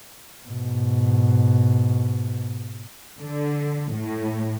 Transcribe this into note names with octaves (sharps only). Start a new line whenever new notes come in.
G#2 B2
D3
A2